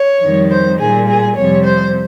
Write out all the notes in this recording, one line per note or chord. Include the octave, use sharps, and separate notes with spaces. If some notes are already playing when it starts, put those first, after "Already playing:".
Already playing: C#5
F2 D#3 G3
C5
A#2 G3 G#4
G#4
F2 C3 G3 C#5
C5